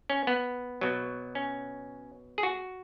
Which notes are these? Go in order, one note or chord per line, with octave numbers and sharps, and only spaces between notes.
C#4
B3
B2 F#3
C#4
G#4
F#4